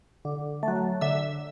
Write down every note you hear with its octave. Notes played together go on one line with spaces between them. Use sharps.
D3
A3
F#3
D3 E5 E6